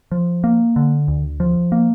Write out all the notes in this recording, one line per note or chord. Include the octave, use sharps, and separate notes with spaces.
F3
A#3
D3
D2
F3
A#3